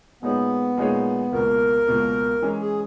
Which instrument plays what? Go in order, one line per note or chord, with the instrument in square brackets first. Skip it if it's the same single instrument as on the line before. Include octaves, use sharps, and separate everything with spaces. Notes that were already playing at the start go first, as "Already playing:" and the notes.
[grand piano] A#2 G#3 D#4 G#4 C#5 [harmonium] B3
[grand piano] A#2 G#3 D#4 G#4 C#5
[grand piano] C#2 B2 A#3 [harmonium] A#4
[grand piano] C#2 B2 A#3
E3 G#3 C#4
[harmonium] G#4